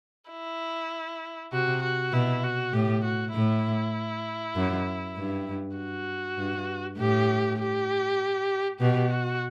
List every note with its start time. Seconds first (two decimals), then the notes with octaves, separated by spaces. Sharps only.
0.31 E4
1.53 C3 F#4
1.83 F#4
2.13 B2 E4
2.44 F#4
2.73 A2 G4
3.04 F#4
3.34 A2 E4
4.56 F#2
5.17 G2
5.77 F#4
6.38 G2
6.98 A2 G4
7.59 G4
8.80 B2 G4
9.11 F#4